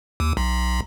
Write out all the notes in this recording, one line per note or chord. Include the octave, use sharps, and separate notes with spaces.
D#2
B1